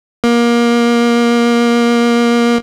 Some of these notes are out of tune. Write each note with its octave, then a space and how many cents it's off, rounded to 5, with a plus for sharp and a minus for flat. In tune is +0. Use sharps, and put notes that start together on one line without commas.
A#3 +25